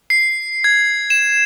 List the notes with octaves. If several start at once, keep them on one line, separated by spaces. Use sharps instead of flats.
C7
G#6
E7